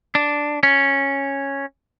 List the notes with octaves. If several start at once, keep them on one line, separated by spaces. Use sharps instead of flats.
D4
C#4